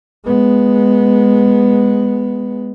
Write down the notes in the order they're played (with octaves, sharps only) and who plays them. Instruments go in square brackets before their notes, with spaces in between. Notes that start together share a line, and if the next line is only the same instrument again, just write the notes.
[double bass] G#3 B3